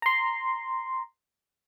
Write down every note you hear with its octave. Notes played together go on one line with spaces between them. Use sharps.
A#5 C6